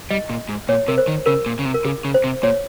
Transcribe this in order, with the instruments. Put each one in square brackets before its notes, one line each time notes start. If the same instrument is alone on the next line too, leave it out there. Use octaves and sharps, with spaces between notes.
[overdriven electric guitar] G3 [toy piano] D#5
[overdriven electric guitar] A#2
G#2
[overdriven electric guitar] A#2 [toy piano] C#5
[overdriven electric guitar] C3 [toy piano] A#4
[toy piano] C5
[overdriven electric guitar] D#3
[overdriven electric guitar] C#3 [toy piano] A#4
[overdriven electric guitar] A#2
C#3
C3
[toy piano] A#4
[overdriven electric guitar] C#3 [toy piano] G#4
[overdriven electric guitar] C#3
[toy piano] C5
[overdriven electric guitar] C3
[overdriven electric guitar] A#2 [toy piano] C#5